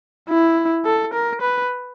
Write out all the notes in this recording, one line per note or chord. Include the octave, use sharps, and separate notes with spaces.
E4
A4
A#4
B4